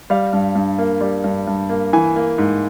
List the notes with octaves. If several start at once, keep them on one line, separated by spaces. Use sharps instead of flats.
G3 F5
G2
G2
A#3
G3
G2
G2
A#3
E3 G#5
A#3
G#2